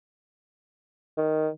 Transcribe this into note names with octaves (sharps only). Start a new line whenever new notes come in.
D#3